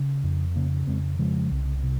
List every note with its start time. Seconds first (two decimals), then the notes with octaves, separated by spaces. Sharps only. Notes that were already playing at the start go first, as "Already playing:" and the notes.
Already playing: C#3
0.24 F2
0.56 C#3 A#3 C#4
0.87 F2 G#3 C4
1.19 C#3 F3 G#3
1.51 C2
1.83 C3